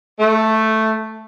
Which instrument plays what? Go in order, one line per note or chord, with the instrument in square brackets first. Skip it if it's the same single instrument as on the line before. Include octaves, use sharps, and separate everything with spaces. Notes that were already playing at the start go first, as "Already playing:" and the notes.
[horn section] A3